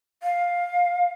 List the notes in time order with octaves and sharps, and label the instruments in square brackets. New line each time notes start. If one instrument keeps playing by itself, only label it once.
[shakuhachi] F5